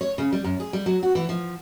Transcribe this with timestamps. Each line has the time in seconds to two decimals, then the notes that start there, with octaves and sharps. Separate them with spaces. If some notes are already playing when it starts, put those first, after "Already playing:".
0.01 C#5
0.18 C#3
0.32 G3
0.44 F#2
0.60 G#4
0.73 G3
0.86 F#3
1.03 F#4
1.15 E3
1.29 F3